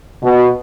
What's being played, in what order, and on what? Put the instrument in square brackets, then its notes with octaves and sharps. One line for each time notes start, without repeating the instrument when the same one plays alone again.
[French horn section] B2